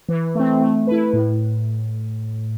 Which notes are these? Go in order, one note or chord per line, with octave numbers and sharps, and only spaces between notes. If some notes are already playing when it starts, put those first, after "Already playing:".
E3
A3 C4
A3
E4 B4
A2